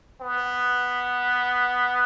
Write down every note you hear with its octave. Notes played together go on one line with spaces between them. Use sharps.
B3